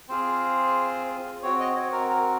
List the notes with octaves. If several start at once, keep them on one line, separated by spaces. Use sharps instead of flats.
C4 F4 G#4 C5
C4 F#4 C#5
D#5
C#5
A#4
A#4